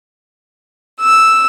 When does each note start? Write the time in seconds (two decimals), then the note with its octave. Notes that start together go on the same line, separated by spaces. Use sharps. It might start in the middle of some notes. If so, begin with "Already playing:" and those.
1.00 E6